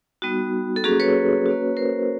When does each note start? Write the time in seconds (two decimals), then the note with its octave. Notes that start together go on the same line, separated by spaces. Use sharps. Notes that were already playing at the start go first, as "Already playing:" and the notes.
0.22 G3 B3 D#4 F#4
0.76 A4
0.84 F#3 A#3 C#4 F#4 G#4
1.00 B4 C#5
1.46 A#3 C#4 F#4
1.77 A#4 C5